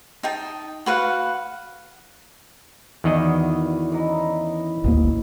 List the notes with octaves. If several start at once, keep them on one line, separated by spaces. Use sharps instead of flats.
D#4 G5 A5
F#4 B4 F5 F#5
E2 B2 D#3 E3 D5 D#5
C#3 E3 D#4
G#1 D2 A#3